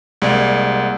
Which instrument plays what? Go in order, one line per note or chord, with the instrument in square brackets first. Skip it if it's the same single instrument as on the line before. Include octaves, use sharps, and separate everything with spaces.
[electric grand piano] C2 G#3 A#3 D5 F#5